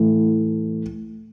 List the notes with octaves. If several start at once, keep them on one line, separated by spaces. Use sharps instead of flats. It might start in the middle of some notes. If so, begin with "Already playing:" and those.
Already playing: A2 E3 A3